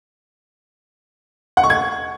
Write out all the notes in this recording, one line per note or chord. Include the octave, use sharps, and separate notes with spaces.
F#5
C#6
G#6